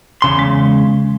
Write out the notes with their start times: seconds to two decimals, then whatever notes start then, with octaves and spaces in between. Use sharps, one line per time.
0.22 E2 C#3 C6
0.39 G#3